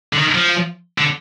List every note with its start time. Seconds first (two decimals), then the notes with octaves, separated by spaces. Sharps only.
0.13 D3
0.18 D#3
0.35 F3
0.98 D3